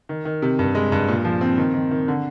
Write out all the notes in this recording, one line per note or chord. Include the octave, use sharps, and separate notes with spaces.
D#3
D#3
C3
G2
G#3
G2
A#2
F3
C4
D#3
D#3
D#3
D3